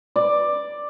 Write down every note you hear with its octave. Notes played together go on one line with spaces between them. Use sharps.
D5